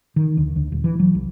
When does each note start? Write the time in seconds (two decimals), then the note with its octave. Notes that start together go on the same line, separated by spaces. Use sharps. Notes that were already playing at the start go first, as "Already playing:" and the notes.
0.16 D#3
0.37 D2
0.56 D2
0.72 D#1
0.84 E3
0.99 F#3
1.15 C2